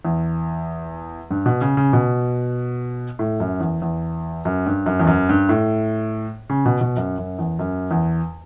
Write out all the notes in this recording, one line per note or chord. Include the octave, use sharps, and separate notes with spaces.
E2
G2
B2
C#3
C#3
B2
A2
F#2
E2
E2
F#2
G2
F#2
E2
F#2
G2
A2
C#3
B2
B2
F#2
F#2
E2
F#2
E2